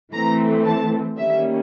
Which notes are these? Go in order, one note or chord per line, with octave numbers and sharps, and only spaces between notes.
E3 A3 C4 A#5
A5
D#3 G3 A#3 C#4 E5